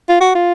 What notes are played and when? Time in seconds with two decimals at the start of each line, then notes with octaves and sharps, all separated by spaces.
0.09 F4
0.21 F#4
0.35 F4